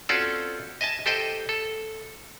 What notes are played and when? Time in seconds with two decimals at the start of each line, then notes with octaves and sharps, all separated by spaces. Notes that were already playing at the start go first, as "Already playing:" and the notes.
0.09 C4 C#4 F4 F#4 A4 D5
0.81 D#5 E5 G#5 A5
1.06 G4 A4 C5 D#5 G5
1.49 A4